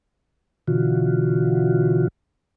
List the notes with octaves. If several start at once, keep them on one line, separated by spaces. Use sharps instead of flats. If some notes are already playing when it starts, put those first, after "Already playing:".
B2 D3 E3 F4 F#4